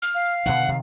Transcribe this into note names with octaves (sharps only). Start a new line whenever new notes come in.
F6
F5
B2 D3 D#3 F#5
C3 D#3